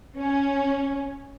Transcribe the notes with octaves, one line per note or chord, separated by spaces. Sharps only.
C#4